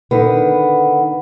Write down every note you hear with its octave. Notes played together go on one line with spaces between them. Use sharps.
D3 D#3 B3 B4